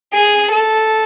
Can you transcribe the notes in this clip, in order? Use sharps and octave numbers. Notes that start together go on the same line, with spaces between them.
G#4
A4